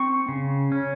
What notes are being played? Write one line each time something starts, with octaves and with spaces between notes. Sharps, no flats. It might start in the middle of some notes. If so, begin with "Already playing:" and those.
Already playing: C4 C#6
C#3
C#4